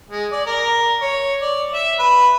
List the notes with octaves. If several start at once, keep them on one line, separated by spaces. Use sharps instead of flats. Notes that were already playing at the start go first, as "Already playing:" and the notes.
G#3
D5
A#4
C#5
D5
E5
B4